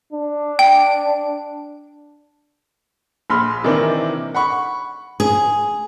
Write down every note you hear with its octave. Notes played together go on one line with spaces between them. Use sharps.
D4
G5
A#1 B5 C6 F6
C3 D#3 E3 A#3 D4
F#5 B5 C#6
G#4